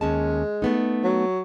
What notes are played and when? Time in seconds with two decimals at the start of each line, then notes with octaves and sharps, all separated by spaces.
0.01 D#2 G#3 C#4 A5
0.62 A3 B3 D#4
1.04 F#3